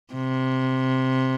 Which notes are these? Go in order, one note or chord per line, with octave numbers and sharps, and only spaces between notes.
C3